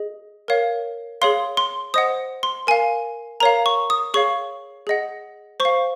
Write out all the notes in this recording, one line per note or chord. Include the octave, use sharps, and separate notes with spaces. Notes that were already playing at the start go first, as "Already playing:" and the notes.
Already playing: G#4 D#5
A#4 C#5 F5
G#4 C#5 F5 C6
C6
C5 D#5 F#5 D#6
C6
A#4 F5 G#5
A#4 C#5 F5 A#5
C#6
D#6
G#4 C#5 F5 C#6
G#4 D#5 F#5
C5 C#6
F5